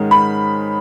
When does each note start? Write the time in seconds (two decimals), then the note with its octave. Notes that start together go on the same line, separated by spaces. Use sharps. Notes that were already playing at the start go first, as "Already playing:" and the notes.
Already playing: G#2 D#3 G#3 C#4
0.11 B5